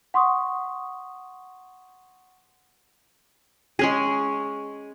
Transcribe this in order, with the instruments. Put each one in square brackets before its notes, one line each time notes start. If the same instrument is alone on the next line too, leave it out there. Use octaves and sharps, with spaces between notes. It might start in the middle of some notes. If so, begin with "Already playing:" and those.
[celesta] F#5 C6 C#6 D#6
[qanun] G#3 C#4 G#4